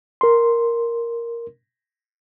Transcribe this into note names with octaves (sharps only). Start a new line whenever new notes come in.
A#4 C6